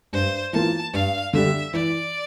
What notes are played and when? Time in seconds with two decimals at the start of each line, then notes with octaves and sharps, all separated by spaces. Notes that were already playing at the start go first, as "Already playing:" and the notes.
0.13 G2 C5
0.53 E3 A#3 F4 A5
0.93 G2 F5
1.33 D3 G3 E5
1.73 E3 D5